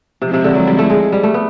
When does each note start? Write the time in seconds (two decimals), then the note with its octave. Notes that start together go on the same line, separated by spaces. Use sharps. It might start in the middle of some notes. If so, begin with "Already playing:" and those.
0.22 C3 F3 G#3 C4 E4
0.33 C3
0.44 D3
0.55 F#3
0.67 G3
0.79 A3
0.90 G#3
1.12 G3
1.23 A3
1.34 B3